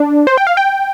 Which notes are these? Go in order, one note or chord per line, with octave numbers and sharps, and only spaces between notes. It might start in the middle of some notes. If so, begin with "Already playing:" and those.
Already playing: D4
C5
G5
F5
G5